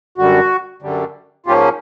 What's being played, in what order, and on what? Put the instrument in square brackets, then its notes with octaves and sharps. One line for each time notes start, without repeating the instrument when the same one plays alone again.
[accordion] F#2 D3 G3 F#4
F#2 D3 G3
G#2 F3 A#3 C#4 F4 G4